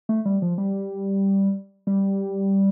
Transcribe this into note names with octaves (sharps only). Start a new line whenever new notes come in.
A3
G3
F3
G3
G3